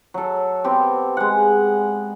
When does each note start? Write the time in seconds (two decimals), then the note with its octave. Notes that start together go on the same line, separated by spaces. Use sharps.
0.14 F#3 A4
0.64 B3 C4 G4
1.17 G#3 F#5